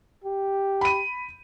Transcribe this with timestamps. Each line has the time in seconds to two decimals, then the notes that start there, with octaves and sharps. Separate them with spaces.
0.24 G4
0.81 B5 D#7